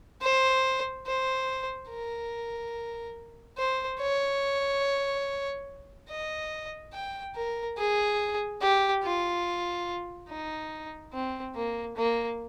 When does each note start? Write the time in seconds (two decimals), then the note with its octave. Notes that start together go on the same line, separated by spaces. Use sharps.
0.22 C5
1.07 C5
1.90 A#4
3.58 C5
4.00 C#5
6.09 D#5
6.93 G5
7.35 A#4
7.78 G#4
8.61 G4
9.03 F4
10.29 D#4
11.13 C4
11.55 A#3
11.97 A#3